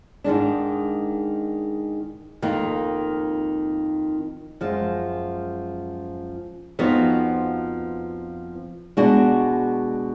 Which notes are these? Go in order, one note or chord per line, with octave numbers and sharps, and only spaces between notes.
G#2 D#3 G#3 D4
F2 D#3 A#3
F#2 F3 G#3
F2 F3 B3 D#4 F#4
B2 G#3 D4 F#4